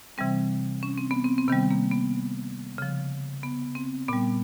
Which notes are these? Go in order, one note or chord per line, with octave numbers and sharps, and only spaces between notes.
C3 E3 G3 C4
C#4
C4
B3
C4
C4
C3 D#3 G3 B3
A#3
B3
C#3 F3
B3
C4
A#2 G3 B3